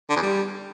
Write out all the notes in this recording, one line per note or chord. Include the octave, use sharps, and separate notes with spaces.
D3
E2
G3